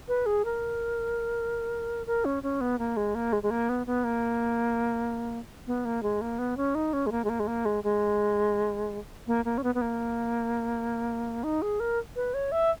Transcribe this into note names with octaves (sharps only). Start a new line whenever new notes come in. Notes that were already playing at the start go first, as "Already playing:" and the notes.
B4
G#4
A#4
A#4
C#4
C#4
B3
A#3
G#3
A#3
G#3
G#3
A#3
B3
B3
A#3
B3
A#3
G#3
A#3
B3
C#4
D#4
C#4
G#3
A#3
G#3
A#3
G#3
A#3
G#3
G#3
A#3
A#3
C#4
B3
B3
A#3
D#4
G#4
A#4
B4
C#5
E5